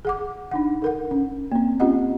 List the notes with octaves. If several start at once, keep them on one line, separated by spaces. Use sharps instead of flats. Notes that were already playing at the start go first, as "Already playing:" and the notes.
G#4 F#5 D6
D4 D#4 F#5
A4 A#4 F#5
C#4
A#3 C4
C4 C#4 F4 G4 D#5 F#5